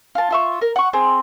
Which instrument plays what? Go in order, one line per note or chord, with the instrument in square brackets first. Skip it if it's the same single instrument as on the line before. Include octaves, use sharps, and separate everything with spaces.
[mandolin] F4 A5
F4 E5 C#6
A#4
F#5 C#6
C4 G#4